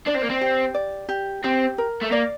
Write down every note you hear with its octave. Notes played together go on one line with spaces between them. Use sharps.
D4 D5
C4
A#3
C4
G4
D5
G4
C4 G4
A#4
A3
A#3 D5